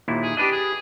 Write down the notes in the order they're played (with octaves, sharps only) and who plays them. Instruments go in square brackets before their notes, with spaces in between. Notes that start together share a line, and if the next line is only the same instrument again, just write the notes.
[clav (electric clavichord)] D#2 A#2 E4
[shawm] G#4
[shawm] D4 [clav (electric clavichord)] G4 B4 D#5
[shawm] G#4